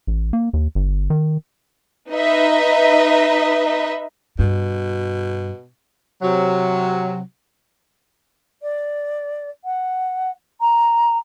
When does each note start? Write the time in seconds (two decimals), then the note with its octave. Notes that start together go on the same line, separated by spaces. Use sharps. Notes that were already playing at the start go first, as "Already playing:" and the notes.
0.07 A1
0.33 A#3
0.53 D#2
0.75 G1
1.10 D#3
2.11 D#4 B4 D#5 E5
4.39 G2 B2
6.22 C3 F#3
8.62 D5
9.64 F#5
10.61 A#5